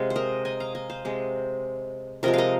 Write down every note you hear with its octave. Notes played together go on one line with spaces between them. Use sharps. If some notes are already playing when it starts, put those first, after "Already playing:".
Already playing: C3 G#3 F5
C5
A#4 D#5
D#5 G#5
F5 A#5
D#5 G#5
C5 F5
C3 G#3
C3 F3 G#3 A#4 D#5
A#4 D#5 F5